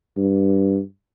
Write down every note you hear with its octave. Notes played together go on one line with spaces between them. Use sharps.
G2